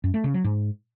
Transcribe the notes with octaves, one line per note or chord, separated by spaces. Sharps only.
F#2
A3
C#3
F#3
G#2